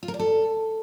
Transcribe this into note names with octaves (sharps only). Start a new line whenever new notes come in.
F4
A#4
D5
A4